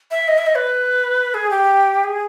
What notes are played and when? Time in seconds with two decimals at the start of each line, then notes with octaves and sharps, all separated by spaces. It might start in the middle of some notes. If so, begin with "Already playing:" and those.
0.11 E5
0.28 D#5
0.38 E5
0.47 D#5
0.55 B4
1.34 G#4
1.51 G4
2.04 G#4